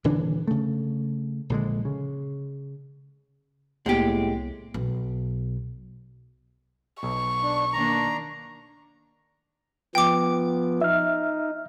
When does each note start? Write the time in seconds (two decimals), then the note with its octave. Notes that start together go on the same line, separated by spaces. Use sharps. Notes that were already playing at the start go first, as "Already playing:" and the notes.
0.04 D#1 D3 E3 D4
0.48 C#3 A3
1.50 A#1 D3 G#3
1.85 C#3
3.86 C2 A2 G#3 A#3 B3 G4
4.74 B1
7.03 B1 C#6
7.43 D4
7.73 D#3 A#3 D4 A#5
9.95 F3 B3 G5 D6
10.81 D#4 E5 F6